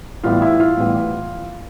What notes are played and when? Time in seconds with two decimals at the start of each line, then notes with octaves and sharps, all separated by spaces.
0.23 A2 E3 G3 B3 F4
0.42 E4
0.60 F4
0.77 A2 E3 G3 B3